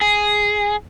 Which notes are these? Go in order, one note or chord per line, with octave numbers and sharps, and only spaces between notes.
G#4